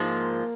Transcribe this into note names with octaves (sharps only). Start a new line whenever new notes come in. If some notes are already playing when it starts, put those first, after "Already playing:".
Already playing: G#2 F3 G#3 A#3 F4